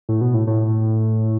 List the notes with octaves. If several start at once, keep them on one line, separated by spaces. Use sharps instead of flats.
A2
B2
A2
A2